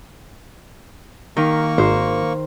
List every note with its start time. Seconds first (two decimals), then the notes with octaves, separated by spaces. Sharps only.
1.37 D#3 A#3 C#6
1.78 G#1 C5